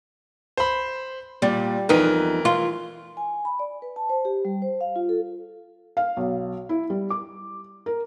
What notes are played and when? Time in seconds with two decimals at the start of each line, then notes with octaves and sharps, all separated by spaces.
0.57 C5 B5
1.42 A#2 G3
1.89 F2 E3 B3 D#4 A#4
2.45 F4
3.17 G#5
3.45 B5
3.59 D5
3.82 B4
3.96 A5
4.10 C5
4.25 G4
4.45 G3
4.62 C5
4.81 F5
4.96 F4
5.09 A4
5.97 F5
6.17 B1
6.69 E4
6.90 G3
7.10 D6
7.86 A#4